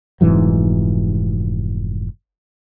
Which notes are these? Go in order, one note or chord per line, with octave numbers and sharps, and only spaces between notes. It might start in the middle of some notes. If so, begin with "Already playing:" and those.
F1 G#2 E3 F#3